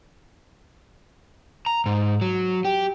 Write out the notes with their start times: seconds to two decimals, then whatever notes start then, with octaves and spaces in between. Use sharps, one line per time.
1.66 A#5
1.86 G#2
2.21 F#3
2.65 G4